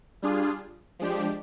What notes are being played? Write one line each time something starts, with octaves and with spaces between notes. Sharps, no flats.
G3 D4 F4 G#4
F3 G#3 D4 G4